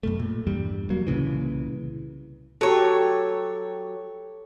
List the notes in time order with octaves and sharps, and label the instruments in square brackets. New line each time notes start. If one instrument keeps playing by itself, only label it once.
[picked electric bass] F#2 B2 A3
A#2
E2 G2 G3
E1 F#3 A#3
C2 A#2 C#3 E3
[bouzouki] F#3 C#5 [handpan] G4 A4